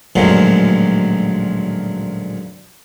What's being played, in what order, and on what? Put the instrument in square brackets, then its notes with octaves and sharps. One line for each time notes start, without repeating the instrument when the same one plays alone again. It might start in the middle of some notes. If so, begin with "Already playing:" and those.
[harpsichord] A1 D2 A#2 F3 F#3 G#3